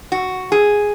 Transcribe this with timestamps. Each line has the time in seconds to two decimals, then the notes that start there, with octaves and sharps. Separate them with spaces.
0.12 F#4
0.52 G#4